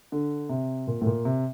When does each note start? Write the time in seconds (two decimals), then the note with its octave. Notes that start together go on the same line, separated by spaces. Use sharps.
0.12 D3
0.49 C3
0.87 A#2
1.01 A2
1.06 A#2
1.25 C3